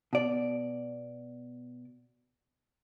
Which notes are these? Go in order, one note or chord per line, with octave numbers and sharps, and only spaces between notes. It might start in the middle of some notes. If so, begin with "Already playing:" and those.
B2 D5